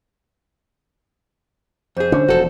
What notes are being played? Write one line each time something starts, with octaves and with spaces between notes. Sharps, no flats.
F2 G#4 C5
D3 C#4 D4
E1 F3 F#4 A4